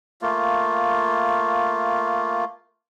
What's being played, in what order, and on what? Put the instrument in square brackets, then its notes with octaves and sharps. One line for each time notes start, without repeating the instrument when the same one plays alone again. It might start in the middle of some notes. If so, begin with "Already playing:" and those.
[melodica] A3 A#3 F4